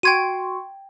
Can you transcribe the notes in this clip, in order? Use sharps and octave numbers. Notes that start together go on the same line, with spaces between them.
F#4 G5 C6 C#6 G#6 D#7